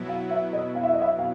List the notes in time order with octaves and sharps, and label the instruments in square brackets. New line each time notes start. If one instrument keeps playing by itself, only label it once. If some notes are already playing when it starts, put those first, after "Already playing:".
Already playing: [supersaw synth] B2 F#3 B3 E4
[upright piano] F5
E5
D#5
F5
E5
D#5
E5
F5